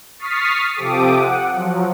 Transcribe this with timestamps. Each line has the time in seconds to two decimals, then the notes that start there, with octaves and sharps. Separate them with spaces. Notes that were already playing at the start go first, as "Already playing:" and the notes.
0.19 C#6 D#6 F6 A6 B6 C7
0.74 C3 F3 G4 A4 D6 D#6
1.14 F#5
1.49 F3 F#3